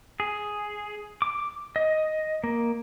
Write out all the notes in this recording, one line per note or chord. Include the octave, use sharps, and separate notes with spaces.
G#4
D6
D#5
A#3